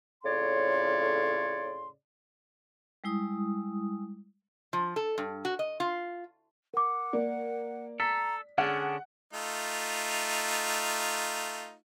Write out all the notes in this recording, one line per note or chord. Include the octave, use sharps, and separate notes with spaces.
F2 A2 C#3 C#5 D5 C6
G3 G#3 E4 D#6
F3
A4
G2
F#4
D#5
F4
A#4 F#5 D6
A#3 D5
A4 A#5 B6
D3 C#4 D4 G#4 F#5
A3 D#4 F4